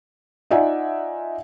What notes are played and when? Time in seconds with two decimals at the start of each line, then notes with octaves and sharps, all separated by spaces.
0.51 D#4 F4 D5 E5 F#5 G#5